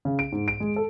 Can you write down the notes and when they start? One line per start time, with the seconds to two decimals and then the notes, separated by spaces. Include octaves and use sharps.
0.05 C#3
0.19 D7
0.32 G#2
0.48 D7
0.60 G#3
0.76 A4